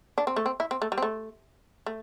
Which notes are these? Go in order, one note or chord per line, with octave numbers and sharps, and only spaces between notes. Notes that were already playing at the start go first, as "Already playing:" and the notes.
D4
C4
A3
C4
E4
C4
A3
G3
C4
A3
A3